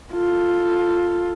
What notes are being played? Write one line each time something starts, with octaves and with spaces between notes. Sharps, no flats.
F4 A4